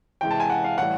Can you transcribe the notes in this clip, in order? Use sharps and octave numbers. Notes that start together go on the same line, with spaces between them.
C3 E3 G#3 G5
A5
G#5
F#5
F5
A2 E3 G3 F#5